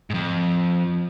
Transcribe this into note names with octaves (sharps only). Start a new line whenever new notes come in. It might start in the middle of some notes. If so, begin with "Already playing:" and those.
F2 G#2